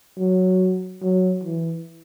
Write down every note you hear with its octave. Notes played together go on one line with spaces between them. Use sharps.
F#3
F#3
E3